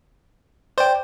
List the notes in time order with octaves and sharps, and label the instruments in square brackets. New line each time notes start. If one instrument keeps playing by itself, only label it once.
[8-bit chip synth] C5 [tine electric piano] D5 G5